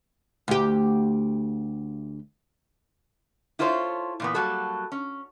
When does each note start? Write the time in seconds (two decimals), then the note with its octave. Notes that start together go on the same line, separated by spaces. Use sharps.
0.48 D2 G4
3.59 E4 F4 A4 C5 C#5
4.20 A#2 E3 B3
4.34 F#3 G3 A#3 F#4 A4
4.92 C#4